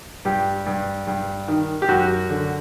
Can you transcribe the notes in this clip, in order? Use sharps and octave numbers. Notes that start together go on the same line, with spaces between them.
G2 G4
G2
G2
D#3
G4
F#2 F#4
D3